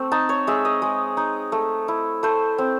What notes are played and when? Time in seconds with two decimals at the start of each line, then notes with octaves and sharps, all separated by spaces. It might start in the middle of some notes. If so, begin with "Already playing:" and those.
Already playing: A3 C4
0.12 D#4 A5
0.29 C#5
0.47 G#3 E5
0.65 D#5
0.82 G#3
1.17 D#4
1.52 A3
1.88 E4
2.23 A3 C5
2.58 C4